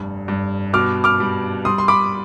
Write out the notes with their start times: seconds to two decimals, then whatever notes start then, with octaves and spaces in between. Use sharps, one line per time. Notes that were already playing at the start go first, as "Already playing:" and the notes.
Already playing: F1 G2
0.28 G2
0.73 B2 D6 F6
1.04 D6 F6
1.20 G3
1.65 G3 C6 D#6
1.78 C6
1.88 B5 D6